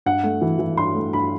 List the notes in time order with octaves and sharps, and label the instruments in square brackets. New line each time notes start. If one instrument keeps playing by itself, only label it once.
[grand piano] G2 F#5
A3
E3
E3
G2 C6
A3
G2 B5